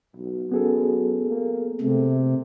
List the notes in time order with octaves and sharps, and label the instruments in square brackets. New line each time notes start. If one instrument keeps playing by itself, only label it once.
[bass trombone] B1
[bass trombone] F#2 [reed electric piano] B3 G#4 A4
[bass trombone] A#3
[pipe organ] C3 [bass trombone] A3